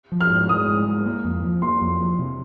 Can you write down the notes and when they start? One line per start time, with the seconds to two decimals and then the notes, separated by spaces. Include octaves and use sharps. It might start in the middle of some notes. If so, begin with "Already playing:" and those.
0.12 F3
0.21 F6
0.30 G#2
0.49 G#3 D#6
0.68 G#2
0.86 G#3
1.06 A#3
1.24 F2
1.43 F3
1.62 A#3 C6
1.81 F2
2.00 F3
2.19 C3